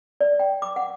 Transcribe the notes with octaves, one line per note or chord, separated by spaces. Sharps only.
D5
G5
D6
F#5